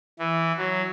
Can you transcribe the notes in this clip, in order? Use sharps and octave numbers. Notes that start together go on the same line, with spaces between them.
E3
F#3